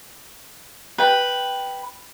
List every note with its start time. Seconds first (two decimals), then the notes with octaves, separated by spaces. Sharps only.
0.98 B4 G5